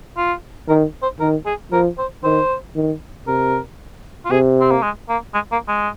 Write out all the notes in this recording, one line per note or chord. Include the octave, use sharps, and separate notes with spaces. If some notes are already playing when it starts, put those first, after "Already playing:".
F4
D#3 A#4
C5
D#3 A#4
G#4
F3 A#4
C5
D#3 C5
D#3
C3 A#4
F4
C3 G#4
C4
A#3
G#3
A#3
G#3
A#3
G#3